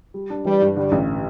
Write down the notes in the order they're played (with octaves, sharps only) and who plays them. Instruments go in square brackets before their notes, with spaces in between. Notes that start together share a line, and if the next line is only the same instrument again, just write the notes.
[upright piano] G3
D4
[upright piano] E3 [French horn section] G3
[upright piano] G2
[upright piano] D3 [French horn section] G3
[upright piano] A1